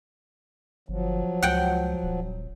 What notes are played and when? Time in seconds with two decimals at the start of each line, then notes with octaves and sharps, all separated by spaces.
0.89 G1 F3 F#3
1.43 C#2 F#5 G5
2.03 D#1